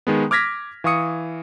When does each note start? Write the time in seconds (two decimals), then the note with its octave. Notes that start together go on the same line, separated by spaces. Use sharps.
0.07 D#3 G#3 B3
0.31 D6 F6 G#6 A#6 B6
0.84 E3 F5 C#6 D#6 C#7